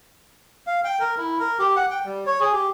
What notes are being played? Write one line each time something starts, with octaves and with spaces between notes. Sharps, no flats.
F5
G5
A#4
E4
A#4
G4
F#5
G5
G3
C#5
G#4
G4